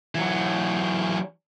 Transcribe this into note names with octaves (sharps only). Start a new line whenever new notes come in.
E3 F#3